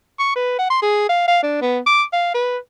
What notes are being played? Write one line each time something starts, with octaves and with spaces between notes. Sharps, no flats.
C#6
B4
F#5
C6
G#4
F5
F5
D4
B3
D6
F5
B4